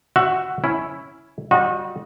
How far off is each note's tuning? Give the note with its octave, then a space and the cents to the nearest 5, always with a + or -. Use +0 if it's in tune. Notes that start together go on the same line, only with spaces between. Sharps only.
F#4 +0 E5 +15
C#4 +0 E4 +0
G3 -15 F#4 -30 D#5 +0